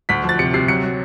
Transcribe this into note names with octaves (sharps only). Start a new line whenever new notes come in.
D2 B6
F3 A6
C3 C#7
C3 C7
F#3 C#7
F#3